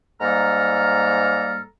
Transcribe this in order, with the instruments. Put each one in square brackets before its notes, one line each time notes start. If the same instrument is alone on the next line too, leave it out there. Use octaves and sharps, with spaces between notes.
[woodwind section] G#2 G3 A#3 A4 A#5 F6